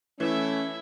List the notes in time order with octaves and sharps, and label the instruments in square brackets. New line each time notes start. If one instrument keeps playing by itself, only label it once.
[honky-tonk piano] E3 [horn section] A3 [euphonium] C#4 [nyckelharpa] E4 E5